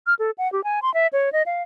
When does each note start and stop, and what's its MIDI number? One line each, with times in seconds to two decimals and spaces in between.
0.07 0.14 89
0.19 0.31 69
0.38 0.50 78
0.52 0.64 67
0.64 0.80 80
0.82 0.93 84
0.94 1.07 76
1.13 1.32 73
1.33 1.43 75
1.46 1.62 77